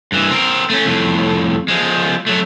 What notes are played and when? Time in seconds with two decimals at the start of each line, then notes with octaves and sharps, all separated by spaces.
0.12 G2 E3
0.30 C4 A#4
0.70 A3 C#4
0.85 F2 A2
1.68 F3 G#3
2.27 F#3 A3